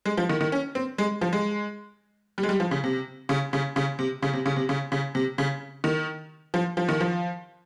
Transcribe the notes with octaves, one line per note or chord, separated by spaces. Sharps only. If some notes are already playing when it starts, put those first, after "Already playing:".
G#3
F3
D#3
D#3
C#4
C4
G#3
F3
G#3
G3
G#3
G3
F3
C#3
C3
C#3
C#3
C#3
C3
C#3
C3
C#3
C3
C#3
C#3
C3
C#3
D#3
F3
F3
D#3
F3